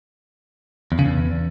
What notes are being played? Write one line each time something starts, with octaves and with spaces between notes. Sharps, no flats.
E2
C#3
E2